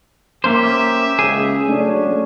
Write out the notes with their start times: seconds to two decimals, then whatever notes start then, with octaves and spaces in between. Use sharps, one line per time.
0.44 A#3 C#4 G4 C5 E5
1.19 C#2 C#3 G#4
1.68 F#3 A3 C#4 D4